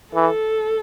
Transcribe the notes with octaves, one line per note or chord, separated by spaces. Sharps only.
E3 A4